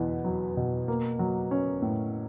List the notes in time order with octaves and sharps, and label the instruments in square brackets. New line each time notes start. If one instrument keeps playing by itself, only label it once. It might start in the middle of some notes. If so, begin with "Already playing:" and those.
Already playing: [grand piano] E2 B2 B3
F#3
B2
A#3
F#3
C#4
A2